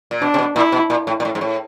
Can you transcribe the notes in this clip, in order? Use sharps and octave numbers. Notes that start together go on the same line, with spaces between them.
A#2
B2 D4
C3
B2
A#2 E4
B2
A#2
A2
A#2
A2
G#2
A2